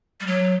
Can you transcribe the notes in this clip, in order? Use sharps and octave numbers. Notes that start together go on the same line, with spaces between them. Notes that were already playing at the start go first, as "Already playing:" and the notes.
G3
F#3